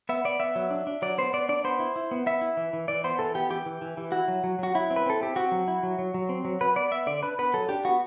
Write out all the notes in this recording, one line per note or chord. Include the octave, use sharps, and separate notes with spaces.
B3 E5
B3 D5
B3 E5
F#3
D4
D4
F#3 D5
B3 C5
B3 D5
D4 D5
B3 C5
E4
E4
B3
B3 E5
E4
E3
E3
E3 D5
B3 C5
E3 A4
B3 G4
E3 G4
E3
E3
E3
E4 F#4
F#3
F#3
F#3 F#4
F#3 E4
C4
B4
C4 A4
C4 G4
C4 F#4
F#3
E4
F#3
F#3
F#3
C4
F#3
F#3 B4
B3 D5
B3 E5
D3 D5
D4 B4
B3 B4
F#3 A4
D4 G4
B3 F#4